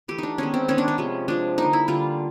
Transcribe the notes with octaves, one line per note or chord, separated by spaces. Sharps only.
E3 A3 G4
D4 D#4
D#3 G#3 B3 C#4
C4
D#3 G#3 B3 C#4
D4
C#4
C3 F3 G#3
C3 F3 G#3 D4
D3 G3 A#3 D#4
E4
D3 G3 A#3 F4